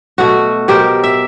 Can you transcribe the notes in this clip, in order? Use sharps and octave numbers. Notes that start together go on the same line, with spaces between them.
B2 A3 F#4
B2 G4 A#4 C5
E5